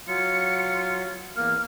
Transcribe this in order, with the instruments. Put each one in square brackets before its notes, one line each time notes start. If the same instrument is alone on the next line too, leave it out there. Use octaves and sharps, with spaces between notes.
[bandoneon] F#3 [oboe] F4 [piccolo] C#7
[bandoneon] E2 A#3 [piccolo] F6